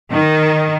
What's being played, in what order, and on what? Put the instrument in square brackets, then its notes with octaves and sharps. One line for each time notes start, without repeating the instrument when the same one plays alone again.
[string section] D#3